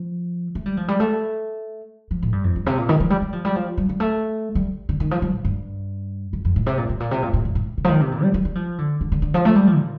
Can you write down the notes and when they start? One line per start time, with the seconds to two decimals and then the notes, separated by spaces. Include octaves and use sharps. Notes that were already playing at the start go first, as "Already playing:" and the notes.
Already playing: F3
0.55 A3
0.66 G3
0.77 F3
0.88 G3
1.00 A3
2.11 F3
2.23 A2
2.33 G2
2.44 F2
2.56 G2
2.66 C3
2.78 A#2
2.89 D#3
3.00 F3
3.10 G3
3.22 G3
3.33 F3
3.45 G3
3.56 F3
3.78 G3
3.89 G3
4.00 A3
4.55 G3
4.89 D3
5.00 D#3
5.11 F3
5.22 G3
5.33 A2
5.45 G2
6.33 F2
6.45 F2
6.56 A2
6.66 C3
6.77 A#2
6.89 A2
7.00 A#2
7.11 C3
7.23 A#2
7.33 A2
7.45 F2
7.55 A2
7.78 C3
7.84 F3
7.89 D#3
8.00 C3
8.12 A#2
8.23 G3
8.34 G3
8.45 G3
8.55 F3
8.78 D3
9.01 D3
9.12 D3
9.22 D3
9.34 F3
9.45 A3
9.55 G3
9.67 F3
9.78 A#2